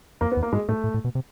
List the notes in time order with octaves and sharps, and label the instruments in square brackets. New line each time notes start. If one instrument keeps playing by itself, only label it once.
[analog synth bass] F2 [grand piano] A#3
[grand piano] B3
[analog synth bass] E2
[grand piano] A#3
[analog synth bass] G#2 [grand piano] G#3
[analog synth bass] A2 [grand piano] A3
[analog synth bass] A2
A2
B2
C3